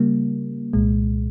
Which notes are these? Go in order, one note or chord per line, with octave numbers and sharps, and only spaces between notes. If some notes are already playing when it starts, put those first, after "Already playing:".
Already playing: C#3 G3 A#3
C2 A#2 G#3